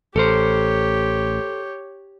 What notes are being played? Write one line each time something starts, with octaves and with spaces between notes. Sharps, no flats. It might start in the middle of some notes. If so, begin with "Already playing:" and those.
A1 G4 A4 A#4 C5 C#5